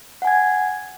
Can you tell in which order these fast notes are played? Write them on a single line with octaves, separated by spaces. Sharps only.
F#5 G#5 G#6